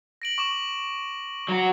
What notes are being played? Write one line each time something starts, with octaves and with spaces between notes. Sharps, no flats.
A#6 D7 F#7
C#6 D6 E7
F#3 F#4